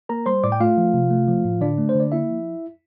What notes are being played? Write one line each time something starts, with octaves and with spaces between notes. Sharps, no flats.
A#3 A#4 A#5
G3 C5 C6
A2 D5 D6
G5
A3 F4 F5
F3
C3
A3
F3
A2
D3 D4 D5
A3
C5
D3 D5
A#3 E4 E5
F3